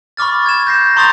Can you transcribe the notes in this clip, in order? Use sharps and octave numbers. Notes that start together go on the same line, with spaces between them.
B5 C#6 D6 F6 A6
G#6 E7
G6 A#6 C7
A#5 C6 C#6 D#6 A6 F7